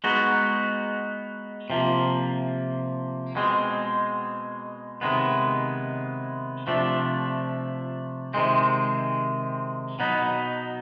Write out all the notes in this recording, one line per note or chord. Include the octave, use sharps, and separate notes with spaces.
G#3 B3 D#4 F#4
C3 F3 A#3
B2 G#3 C4
C3 D#3 G#3 B3
C3 F3 A3 D4
C3 D#3 G#3 C4
B2 F#3 B3 D#4